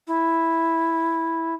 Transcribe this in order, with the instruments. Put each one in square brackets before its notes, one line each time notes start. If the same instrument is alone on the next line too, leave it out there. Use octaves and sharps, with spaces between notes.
[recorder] E4